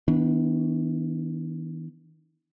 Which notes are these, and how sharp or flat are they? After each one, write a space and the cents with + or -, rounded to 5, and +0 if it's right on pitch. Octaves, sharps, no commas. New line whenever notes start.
E3 -45 B3 +0 D4 +0